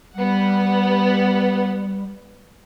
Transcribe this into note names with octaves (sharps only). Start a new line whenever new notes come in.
G3 B3 F#5